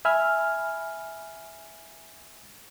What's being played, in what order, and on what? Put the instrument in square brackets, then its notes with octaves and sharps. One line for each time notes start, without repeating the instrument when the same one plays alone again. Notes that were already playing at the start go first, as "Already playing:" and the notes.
[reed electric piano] E5 G#5 B5 F6